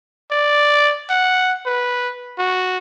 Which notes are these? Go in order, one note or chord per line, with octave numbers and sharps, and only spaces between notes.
D5
F#5
B4
F#4